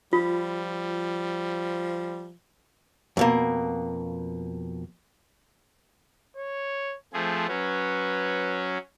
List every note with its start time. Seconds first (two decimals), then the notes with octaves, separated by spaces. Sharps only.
0.13 F3 G3 F4
3.17 F2 B2 A#3
6.37 C#5
7.13 F3 A3 C4 G#4
7.48 F#3 C#4 B4